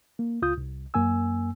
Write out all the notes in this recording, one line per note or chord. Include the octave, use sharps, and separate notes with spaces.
A#3
C#2 F4 D#6 G6
C2
F#2 A#3 G#5 E6